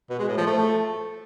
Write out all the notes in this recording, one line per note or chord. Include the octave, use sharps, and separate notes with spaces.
B2
G#3
A2
F3
A3